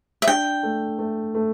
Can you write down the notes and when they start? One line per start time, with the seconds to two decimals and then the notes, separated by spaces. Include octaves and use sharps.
0.22 E5
0.28 D4 G5
0.63 A3
0.99 A3
1.35 A3